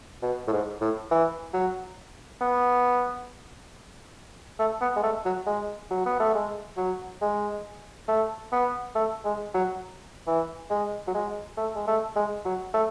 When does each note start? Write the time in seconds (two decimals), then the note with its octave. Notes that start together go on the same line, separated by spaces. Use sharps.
0.23 B2
0.48 A2
0.53 G#2
0.81 A2
1.11 E3
1.53 F#3
2.41 B3
4.59 A3
4.81 B3
4.96 G#3
5.03 A3
5.25 F#3
5.46 G#3
5.91 F#3
6.06 B3
6.20 A3
6.35 G#3
6.77 F#3
7.22 G#3
8.08 A3
8.52 B3
8.95 A3
9.25 G#3
9.54 F#3
10.27 E3
10.70 G#3
11.07 F#3
11.14 G#3
11.57 A3
11.75 G#3
11.87 A3
12.16 G#3
12.45 F#3
12.74 A3